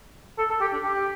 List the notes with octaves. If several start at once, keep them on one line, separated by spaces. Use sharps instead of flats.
A4
A4
G4
D4
G4